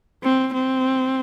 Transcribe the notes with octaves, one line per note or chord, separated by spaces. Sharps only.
C4
C4